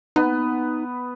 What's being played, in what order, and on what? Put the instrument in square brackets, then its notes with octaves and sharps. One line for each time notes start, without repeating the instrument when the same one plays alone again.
[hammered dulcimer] B3 [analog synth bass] D#4